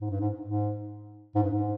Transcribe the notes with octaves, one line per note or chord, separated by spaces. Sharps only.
G#2
G2
G#2
G#2
G#2
G2
G#2